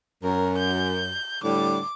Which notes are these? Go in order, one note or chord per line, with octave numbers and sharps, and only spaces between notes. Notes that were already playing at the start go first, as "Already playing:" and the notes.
F#2 A#4
G6
A2 D3 G3 D6